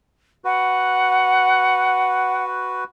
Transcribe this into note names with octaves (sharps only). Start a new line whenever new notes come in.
F#4 B4 F#5